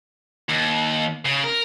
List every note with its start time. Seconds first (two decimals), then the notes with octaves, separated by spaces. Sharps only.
0.49 D#2
1.26 C#3
1.44 A#4